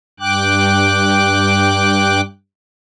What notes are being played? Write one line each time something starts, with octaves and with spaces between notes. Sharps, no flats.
G2 G5 D6 F#6